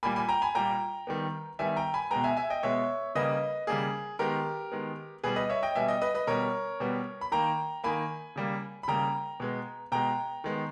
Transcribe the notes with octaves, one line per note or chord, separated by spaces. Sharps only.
A#2 G3 A#3 G#5 B5
G#5 B5
G5 A#5
G#5 B5
A#2 G3 A#3 G5 A#5
D#3 G3 B3
D#3 G3 B3 E5 G#5
G5 A#5
G#5 B5
B2 G#3 B3 G5 A#5
E5 G#5
E5 G#5
D#5 G5
B2 G#3 B3 C#5 E5
C#3 G3 A#3 B4 D#5
C#3 G3 A#3 G#4
D#3 G#3 B3 G4 A#4
D#3 G#3 B3
B2 G3 B3 G#4 B4
B4 D#5
C#5 E5
D#5 G5
B2 G3 B3 E5 G#5
D#5 G5
B4 D#5
B4 D#5
B2 G3 B3 A#4 C#5
B2 G3 B3
B5
D#3 A#3 G5 A#5
D#3 A#3 G#5 B5
C#3 G3 A#3
B5
C#3 G3 A#3 G5 A#5
B2 G#3 B3
B2 G#3 B3 G5 A#5
D#3 G#3 B3